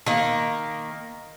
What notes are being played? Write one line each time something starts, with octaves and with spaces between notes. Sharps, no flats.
D#3 A#3